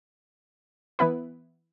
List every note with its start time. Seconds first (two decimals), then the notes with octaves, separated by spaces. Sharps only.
0.99 E3 B3 E4 B4